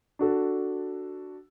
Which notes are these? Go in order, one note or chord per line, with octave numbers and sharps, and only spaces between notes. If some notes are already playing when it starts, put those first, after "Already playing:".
D4 F#4 A4